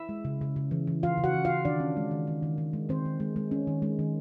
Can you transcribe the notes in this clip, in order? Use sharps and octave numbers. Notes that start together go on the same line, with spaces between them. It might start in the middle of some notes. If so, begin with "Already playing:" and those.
Already playing: E4 E5
G#3
C#3
C#3
C#3
E3
E3
E3 F4 F5
C#3
F#4 F#5
E3
F4 F5
C#3
D#3 D4 D5
C#4
G#3
D#3
D#3
D#3
D#3
G#3
D#3 C4 C5
D#3
G#3
G#3
C#4
D#3
G#3
D#3